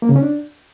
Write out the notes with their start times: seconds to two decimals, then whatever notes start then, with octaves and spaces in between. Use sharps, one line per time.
0.02 A#3
0.09 C#3
0.16 C#4
0.23 D4